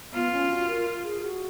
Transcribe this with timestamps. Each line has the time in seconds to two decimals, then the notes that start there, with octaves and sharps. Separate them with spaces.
0.13 B3 F4
0.32 C#4
0.49 F#4
0.67 A#4
1.04 G#4
1.22 F#4